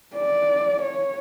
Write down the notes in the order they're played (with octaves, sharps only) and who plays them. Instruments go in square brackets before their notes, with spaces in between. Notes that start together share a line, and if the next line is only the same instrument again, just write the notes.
[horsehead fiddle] D5
C#5